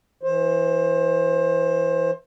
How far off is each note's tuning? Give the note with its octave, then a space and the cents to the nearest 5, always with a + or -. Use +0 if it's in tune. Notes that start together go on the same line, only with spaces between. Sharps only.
E3 +0 C5 +25